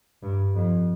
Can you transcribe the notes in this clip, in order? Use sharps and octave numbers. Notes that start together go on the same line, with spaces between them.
G2
F2